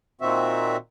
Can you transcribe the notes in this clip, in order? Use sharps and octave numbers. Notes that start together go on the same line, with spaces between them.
A#2 D#3 C4 F#4 E5